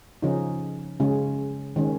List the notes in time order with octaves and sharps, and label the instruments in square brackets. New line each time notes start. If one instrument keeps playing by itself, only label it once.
[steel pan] C#3 F3 C#4 D#4
C#3 G#3 C#4
D#3 G#3 C#4